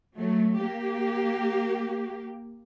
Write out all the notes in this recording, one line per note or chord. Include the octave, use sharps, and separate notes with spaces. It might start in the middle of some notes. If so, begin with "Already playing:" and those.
F#3 A3
A#3 G4